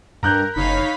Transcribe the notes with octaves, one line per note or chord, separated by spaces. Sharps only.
G2 A#4 A#5 F#6 G6
F#1 D#4 C#5 F5 B5